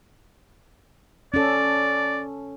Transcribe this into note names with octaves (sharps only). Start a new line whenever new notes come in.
C#4 A4 D5